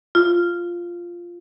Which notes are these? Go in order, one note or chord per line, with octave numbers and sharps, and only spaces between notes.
F4